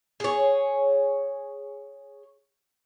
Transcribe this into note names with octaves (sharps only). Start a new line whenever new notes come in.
G#4 C#5